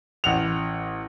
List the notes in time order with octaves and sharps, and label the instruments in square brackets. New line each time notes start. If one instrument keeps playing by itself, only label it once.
[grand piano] A1 F#5 F7